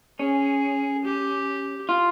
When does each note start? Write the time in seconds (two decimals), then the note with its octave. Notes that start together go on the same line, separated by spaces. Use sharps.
0.19 C#4 G#4
1.04 G4
1.89 F4